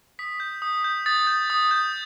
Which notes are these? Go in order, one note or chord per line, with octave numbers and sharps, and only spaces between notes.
D#6 B6
G6
D#6
G6
D#6 A6
G6
D#6
G6